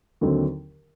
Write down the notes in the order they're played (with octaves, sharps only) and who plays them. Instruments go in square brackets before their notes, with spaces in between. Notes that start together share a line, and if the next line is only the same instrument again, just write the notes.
[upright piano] D#2 D3 F#3 C4 D#4